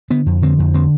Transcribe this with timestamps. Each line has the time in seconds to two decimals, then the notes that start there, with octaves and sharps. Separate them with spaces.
0.10 D3 B3
0.26 F2
0.42 D3 C4
0.59 F2
0.74 D3 C4